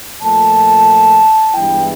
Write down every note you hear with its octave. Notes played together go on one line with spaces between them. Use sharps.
A#2 F3 A3 A5
G2 E3 G#3 B3 E4 G5